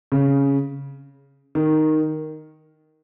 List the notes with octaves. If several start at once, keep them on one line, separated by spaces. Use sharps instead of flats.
C#3
D#3